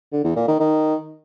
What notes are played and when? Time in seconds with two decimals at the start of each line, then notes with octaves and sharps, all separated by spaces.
0.12 D3
0.24 E2
0.36 A#2
0.48 D#3
0.59 D#3